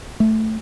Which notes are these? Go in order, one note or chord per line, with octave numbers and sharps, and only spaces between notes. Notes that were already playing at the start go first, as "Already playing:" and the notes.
A3